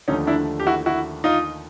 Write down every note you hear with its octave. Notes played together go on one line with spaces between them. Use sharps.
D#2 D3 F3 A3 C#4 D#4
D4 E4
G4
E4 F#4
E4 F#4
D#4 F4